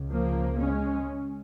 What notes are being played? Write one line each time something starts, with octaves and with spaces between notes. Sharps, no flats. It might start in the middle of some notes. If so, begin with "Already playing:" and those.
Already playing: C#2 C#3
F3 A#3
G#3 C#4